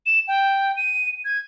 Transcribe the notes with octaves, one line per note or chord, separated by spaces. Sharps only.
E7
G5
D#7
G#6